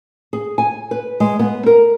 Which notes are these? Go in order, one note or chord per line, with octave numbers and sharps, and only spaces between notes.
G#4
G#5
B4
G#3
B3
A#4